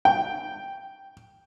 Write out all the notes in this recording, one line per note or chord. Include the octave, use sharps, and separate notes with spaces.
G5